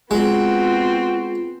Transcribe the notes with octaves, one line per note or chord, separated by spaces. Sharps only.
G#3 B3 C4 F4 F#4